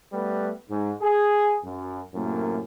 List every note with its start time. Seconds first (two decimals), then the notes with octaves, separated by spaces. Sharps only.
0.12 G3 A3 B3 B4
0.69 G#2
1.01 G#4
1.64 F#2
2.14 F#2 A2 C3 A#3